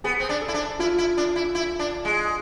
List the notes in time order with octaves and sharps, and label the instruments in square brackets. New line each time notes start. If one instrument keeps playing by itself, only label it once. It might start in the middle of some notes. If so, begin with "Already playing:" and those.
[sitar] B3 [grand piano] G#4
[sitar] C4
D4
[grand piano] A4
[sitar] E4
D4
[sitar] E4 [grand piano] F4
[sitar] E4
D4
E4
E4
D4
G#3